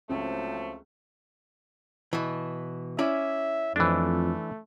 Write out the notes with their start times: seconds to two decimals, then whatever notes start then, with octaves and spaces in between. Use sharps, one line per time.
0.10 C#2 F3 F#3 A3 C4
2.13 B2 E3
2.99 C#4 E4 D5 E5
3.76 F2 E3 A3 D4